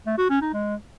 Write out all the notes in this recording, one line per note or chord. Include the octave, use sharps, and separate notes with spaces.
A3
F#4
C#4
D#4
G#3